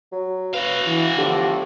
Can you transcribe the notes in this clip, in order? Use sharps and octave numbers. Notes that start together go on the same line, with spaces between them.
F#3
F#4 B4 F5
E3
E2 A2 D3 F3 G4